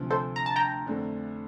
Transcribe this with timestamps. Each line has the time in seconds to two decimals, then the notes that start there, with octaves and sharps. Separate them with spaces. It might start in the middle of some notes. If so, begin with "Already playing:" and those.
Already playing: D2 C3 F3
0.10 A4 C5
0.36 A#5
0.46 A5
0.56 G5 A#5
0.86 F2 D3 A3 D4